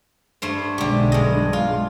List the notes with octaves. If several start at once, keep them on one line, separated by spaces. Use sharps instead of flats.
G2 A3 C5
B1 D3 G#3 G4
G2 D#5
F4